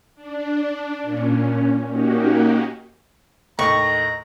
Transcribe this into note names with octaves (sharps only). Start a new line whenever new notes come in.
D4
A#2 C#4
A#3 C#4 D#4 F#4 G4
D#2 A2 D#5 A#5 C#6